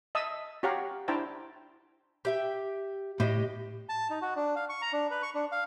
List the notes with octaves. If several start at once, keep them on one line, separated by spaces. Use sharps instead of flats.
D#5 E5 A5 D#6 E6
F#4 G4 C#5 F5 F#5 A#5
D4 E4 C5 G5 A5 A#5
G4 E5 G5
A2 G4 D#5
A5
D#4
F#4
D4
F5
C#6
A#5
D4
B4
C#6
D4
F5